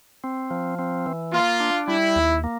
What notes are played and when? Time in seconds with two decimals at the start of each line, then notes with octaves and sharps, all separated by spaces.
0.24 C4
0.51 F3
0.79 C4
1.06 E3
1.33 A#3 F4
1.60 D4
1.88 G3 E4
2.16 D#2
2.44 A#3